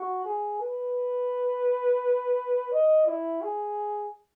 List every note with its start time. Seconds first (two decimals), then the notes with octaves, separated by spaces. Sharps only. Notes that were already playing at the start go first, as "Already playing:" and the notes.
Already playing: F#4
0.25 G#4
0.60 B4
2.71 D#5
3.07 E4
3.42 G#4